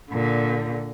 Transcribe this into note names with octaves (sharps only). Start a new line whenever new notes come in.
A#2 D3